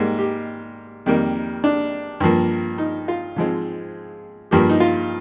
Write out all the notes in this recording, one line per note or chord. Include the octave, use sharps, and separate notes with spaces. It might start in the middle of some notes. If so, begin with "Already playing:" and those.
Already playing: G#2 G3 A#3
G4
F2 D#3 G3 A#3
D4
G2 F3 A#3
D#4
F4
G#2 F3 G#3 C4
G2 F3 A#3 G4
D#4
F4